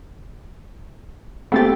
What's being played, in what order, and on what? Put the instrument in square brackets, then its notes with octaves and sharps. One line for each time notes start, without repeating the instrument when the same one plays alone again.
[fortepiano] A3 G4 [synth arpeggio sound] B3 C4 A6